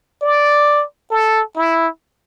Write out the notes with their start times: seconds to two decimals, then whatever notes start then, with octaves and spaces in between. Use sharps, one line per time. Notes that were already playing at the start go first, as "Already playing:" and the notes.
0.21 D5
1.11 A4
1.56 E4